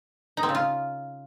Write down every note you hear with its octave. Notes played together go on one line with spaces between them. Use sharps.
D#4
C4
C#3
F4